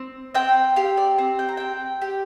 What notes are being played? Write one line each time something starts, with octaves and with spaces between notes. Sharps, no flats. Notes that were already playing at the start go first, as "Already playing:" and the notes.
Already playing: C4
C4 G5
G4 F5
D5
C4
G5
A#5
C4 G5
G4